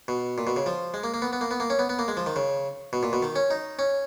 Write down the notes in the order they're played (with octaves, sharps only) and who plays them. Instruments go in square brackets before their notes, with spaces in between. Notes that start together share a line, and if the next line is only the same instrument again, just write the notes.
[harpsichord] B2
A#2
B2
C#3
F3
G#3
A#3
A#3
B3
B3
A#3
B3
A#3
C#4
B3
B3
A#3
G#3
F3
D#3
C#3
B2
A#2
B2
D#3
C#4
D#4
C#4